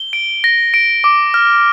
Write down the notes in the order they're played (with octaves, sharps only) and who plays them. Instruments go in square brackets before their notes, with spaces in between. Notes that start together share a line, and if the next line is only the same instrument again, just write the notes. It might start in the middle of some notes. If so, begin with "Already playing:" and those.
Already playing: [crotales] G7
D7
A#6
D7
D6
F6